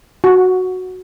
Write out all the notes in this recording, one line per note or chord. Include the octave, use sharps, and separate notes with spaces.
F#4